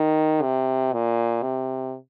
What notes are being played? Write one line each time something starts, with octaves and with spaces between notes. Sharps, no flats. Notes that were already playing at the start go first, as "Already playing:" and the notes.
Already playing: D#3
C3
A#2
C3